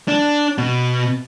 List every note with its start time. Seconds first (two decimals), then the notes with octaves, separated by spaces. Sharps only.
0.08 D4
0.58 B2